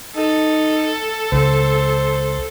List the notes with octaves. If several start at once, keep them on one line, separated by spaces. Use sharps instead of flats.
D#4 A4
C#2 C5